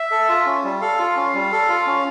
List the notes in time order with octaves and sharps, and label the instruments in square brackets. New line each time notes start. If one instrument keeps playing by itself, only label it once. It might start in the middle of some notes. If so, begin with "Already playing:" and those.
Already playing: [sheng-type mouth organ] E5
[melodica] A4
F4
C#4
G3
[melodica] A4 [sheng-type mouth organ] F5
[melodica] F4
[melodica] C#4 [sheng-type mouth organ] F5
[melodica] G3
A4
F4
C#4